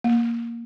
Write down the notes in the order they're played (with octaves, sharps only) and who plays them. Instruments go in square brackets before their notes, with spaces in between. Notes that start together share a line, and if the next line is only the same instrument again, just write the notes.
[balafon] A#3